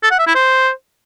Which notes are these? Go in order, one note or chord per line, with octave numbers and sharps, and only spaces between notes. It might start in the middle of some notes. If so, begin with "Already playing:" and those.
A4
F#5
E5
E4
C5